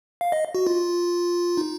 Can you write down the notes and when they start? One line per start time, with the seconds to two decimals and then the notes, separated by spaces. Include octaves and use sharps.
0.21 F5
0.32 D#5
0.55 F#4
0.67 F4
1.57 D#4